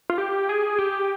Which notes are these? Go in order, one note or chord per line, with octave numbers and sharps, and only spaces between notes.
F4
G4
G#4
G4